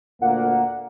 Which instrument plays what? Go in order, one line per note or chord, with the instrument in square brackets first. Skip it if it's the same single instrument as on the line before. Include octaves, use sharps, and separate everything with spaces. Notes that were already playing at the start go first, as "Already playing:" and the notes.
[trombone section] D2 A#2 A#3 [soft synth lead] F#5